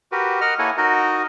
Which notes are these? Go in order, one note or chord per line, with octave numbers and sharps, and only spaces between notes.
F#4 G4 A#4 B4
A#4 D#5 F#5 F6
A#3 E4 A4 C#5 F#5 G#5
D#4 F#4 A#4 D#5